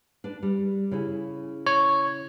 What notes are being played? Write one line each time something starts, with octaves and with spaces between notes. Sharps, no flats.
D4 B4
G3
C#3 E4 G#5
C#5